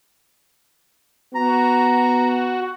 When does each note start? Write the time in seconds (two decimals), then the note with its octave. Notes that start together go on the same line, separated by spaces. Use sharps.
1.35 B3 F#4 A#5